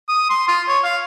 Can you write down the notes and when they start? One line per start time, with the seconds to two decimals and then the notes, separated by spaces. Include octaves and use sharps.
0.09 D#6
0.30 C6
0.48 F4
0.68 C#5
0.84 F5